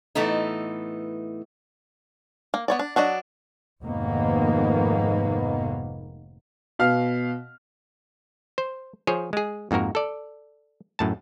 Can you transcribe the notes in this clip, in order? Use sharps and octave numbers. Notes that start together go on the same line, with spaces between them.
A2 E3 A3 B3 D#4
A#3
B3 C#5 D5
D4
F#3 D4 F#4 D#5
F1 G#2 D#3 A#3 B3
B2 F5 F6
C5
F3 G#4 C5 C#5
G#3 G#4
F2 G#2 A#3 F#4 A#4
A4 D5
F#2 A2 A5